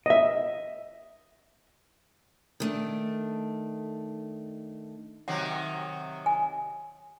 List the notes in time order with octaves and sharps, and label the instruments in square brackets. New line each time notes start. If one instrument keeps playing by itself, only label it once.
[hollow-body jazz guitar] D#5 E5
[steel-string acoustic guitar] D#3 A3 D4
[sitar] C3 D#3 F#3 [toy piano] F#5
[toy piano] G#5